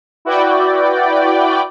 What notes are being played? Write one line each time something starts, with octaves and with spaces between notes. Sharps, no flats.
E4 F#4 B4 D5 G5